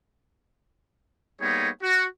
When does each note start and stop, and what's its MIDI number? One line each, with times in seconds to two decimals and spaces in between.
1.41 1.68 55
1.41 1.68 58
1.41 1.68 59
1.41 1.68 63
1.41 1.68 68
1.41 1.68 73
1.82 2.05 66